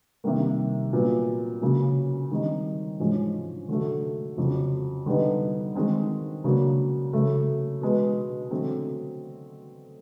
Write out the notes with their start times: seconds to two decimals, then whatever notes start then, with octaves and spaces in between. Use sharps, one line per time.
0.24 C3 D#3 G3 A#3
0.93 A#2 F#3 B3
1.61 C#3 F#3 A#3 C#4
2.31 D#3 G3 C4 D#4
2.99 G#2 F3 G#3 C#4
3.69 D3 F#3 A3
4.38 F2 C#3 F#3
5.06 D3 G3 B3 D#4
5.75 D#3 G#3 C4
6.44 C#3 F#3 A#3 D4
7.13 C#3 F#3 A3
7.82 B2 G#3 B3
8.51 D3 F#3 A3 C4